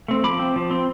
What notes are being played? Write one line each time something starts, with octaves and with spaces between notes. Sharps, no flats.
A3 C4
F3 B5 D6
C4
F3
C4